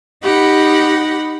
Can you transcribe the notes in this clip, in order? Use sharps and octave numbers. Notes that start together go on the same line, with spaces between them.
D#4 G4 F#5 B5